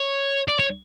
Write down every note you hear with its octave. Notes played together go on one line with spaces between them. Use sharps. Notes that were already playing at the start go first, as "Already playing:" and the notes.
Already playing: C#5
D5
C#5